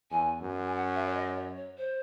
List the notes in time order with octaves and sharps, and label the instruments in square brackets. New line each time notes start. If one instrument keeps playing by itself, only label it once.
[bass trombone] E2 [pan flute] G#5
[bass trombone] F#2
[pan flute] G#5
F#5
E5
C#5
D#5
C#5
C#5
C5